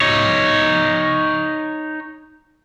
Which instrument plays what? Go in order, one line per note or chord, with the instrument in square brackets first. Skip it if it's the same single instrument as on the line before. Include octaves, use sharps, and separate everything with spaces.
[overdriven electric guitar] D#4 C#5